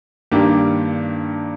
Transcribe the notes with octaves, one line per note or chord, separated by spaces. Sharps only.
G2 D#3 A#3 D4 G4